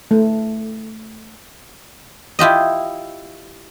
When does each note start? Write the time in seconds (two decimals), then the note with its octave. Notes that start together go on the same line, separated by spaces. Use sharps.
0.11 A3
2.39 E4 F4 G4 D#5